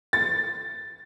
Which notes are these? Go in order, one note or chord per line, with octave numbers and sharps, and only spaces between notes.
A6